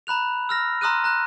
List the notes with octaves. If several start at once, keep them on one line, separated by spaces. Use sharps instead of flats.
A#5 B5 F#6 F7
E6 F6 A#6
A#5 C6 D#6 F6 F#6 D#7
A#5 F#6